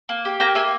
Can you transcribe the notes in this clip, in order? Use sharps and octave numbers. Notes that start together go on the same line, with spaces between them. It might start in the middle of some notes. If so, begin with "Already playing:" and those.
A#3
G4
A#3 G5 A#5
A#3 E5 G#5